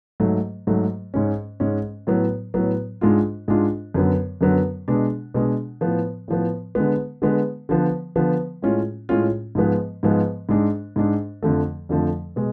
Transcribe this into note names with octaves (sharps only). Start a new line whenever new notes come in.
G#2 F#3 A3
G#2 F#3 A3
G#2 G#3 C#4
G#2 G#3 C#4
A2 F#3 B3
A2 F#3 B3
G#2 G#3 D4 F4
G#2 G#3 D4 F4
F#2 D3 F#3 B3
F#2 D3 F#3 B3
B2 G#3 D4
B2 G#3 D4
A2 F3 B3
A2 F3 B3
D3 G#3 B3
D3 G#3 B3
D3 F3 B3
D3 F3 B3
A2 G#3 C#4 F4
A2 G#3 C#4 F4
G#2 F3 G#3 B3
G#2 F3 G#3 B3
G#2 G#3 D4
G#2 G#3 D4
F2 D3 F3 A3
F2 D3 F3 A3
B2 G#3